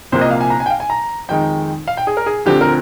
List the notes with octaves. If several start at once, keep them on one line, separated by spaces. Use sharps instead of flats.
C2 C3 F3 A#3 C5
D#5
F5
G#5
A#5
G#5
G5
F5
G#5
A#5
F2 D#3 G#3 D#4 G5
F5
G5
G#4
A#4
G#4
D2 D3 F3 C4 G4
A#4